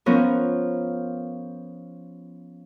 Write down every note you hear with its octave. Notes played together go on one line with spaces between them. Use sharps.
F3 B3 C#4 A#4